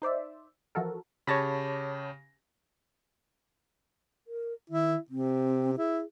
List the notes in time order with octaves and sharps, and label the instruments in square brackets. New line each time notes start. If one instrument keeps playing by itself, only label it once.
[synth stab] D#4 C5 D5 E5
E3 F3 F#4 A4 A#4
[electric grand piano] C#3 G4 A#6 [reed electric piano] C#5 A5 B5
[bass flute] A#4
[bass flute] D#3 [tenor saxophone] E4
[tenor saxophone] C3 [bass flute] C4
[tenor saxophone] E4 [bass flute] G#4